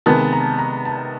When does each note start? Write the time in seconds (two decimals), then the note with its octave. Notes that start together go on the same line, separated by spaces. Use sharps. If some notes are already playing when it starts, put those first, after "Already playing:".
0.06 C3 D#3 G#3 B3 A5
0.33 A#5
0.59 A#5
0.85 A5